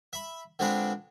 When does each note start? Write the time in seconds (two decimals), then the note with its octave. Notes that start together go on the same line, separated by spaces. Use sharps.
0.13 E5 B5
0.59 D3 F3 G#3 C4 D4 B4